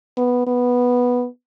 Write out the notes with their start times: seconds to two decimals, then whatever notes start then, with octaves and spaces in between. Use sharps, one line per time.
0.17 B3
0.47 B3